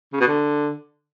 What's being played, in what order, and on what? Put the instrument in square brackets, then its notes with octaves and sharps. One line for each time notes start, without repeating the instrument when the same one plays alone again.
[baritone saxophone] C#3
B2
D3